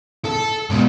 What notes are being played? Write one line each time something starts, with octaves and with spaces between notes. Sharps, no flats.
A4
G#2 B2